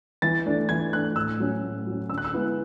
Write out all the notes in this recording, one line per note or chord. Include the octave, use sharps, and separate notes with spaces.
E3 A6
A3 D4
E3 G#6
A3 D4 F#6
A2 E6
F#3 C#4
A2
F#3 C#4
D3 E6
F#6
E6
G#3 B3 E4